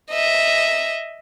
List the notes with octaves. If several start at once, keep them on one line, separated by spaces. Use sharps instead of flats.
D#5 E5